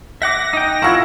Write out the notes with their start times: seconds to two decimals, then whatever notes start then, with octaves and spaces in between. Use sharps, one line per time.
0.22 E5 F#5 D6 A#6
0.53 D#4 G5
0.82 E4 F4 F#5 C#6 E6 G#6